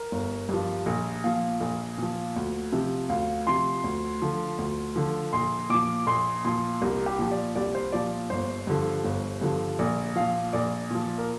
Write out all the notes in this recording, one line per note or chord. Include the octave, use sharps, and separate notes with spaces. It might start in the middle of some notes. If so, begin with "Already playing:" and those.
Already playing: A#4
G1
G2 F3
A#1
A#2 F3 F5
A#1
A#2 F3
D2
C3 F3
D2 F5
C3 F3 C6
D2
D3 F3
D2
D3 F3
A#1 C6
A#2 F3 D6
A#1 C6
A#2 F3 C6
C2 A#4
G4
A#2 F3
D5
C2 D5
C5
A#2 F3 D5
G1 C5
G2 D3 F3
G1
G2 D3 F3
A#1 D5
A#2 F3 F5
A#1 D5
A#2 F3
A#4